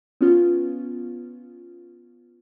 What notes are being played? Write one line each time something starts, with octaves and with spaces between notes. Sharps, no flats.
B3 C#4 F4